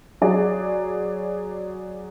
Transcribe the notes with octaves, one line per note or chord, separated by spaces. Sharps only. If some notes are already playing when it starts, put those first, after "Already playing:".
F#3 G#4 D5